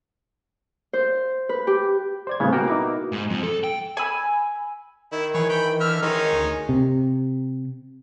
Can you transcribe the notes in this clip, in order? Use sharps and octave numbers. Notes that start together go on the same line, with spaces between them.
C5
B4
G4
C5 D5 G#6
C2 A2 C#3 G3 B3 C4
B2 A#3 F#4 A#4 G5
D#4 E4 D6
G#2
F2
A4
G5
G#5 B5 E6
D#3 E4
E3 G#4 B4 C#5
G5 B5
D3 E5 F6
D#3 E3 G#3 C#4 D#4
D2
C3